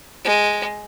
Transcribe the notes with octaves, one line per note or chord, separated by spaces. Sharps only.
G#3